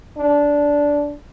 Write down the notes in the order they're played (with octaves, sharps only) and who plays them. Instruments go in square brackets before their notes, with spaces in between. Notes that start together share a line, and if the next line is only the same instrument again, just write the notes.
[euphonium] D4